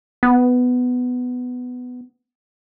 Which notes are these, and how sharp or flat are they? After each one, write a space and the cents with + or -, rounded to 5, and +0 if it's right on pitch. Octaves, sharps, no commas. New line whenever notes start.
B3 +10